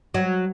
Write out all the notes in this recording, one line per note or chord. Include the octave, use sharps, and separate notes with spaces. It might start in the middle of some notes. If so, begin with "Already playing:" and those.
F#3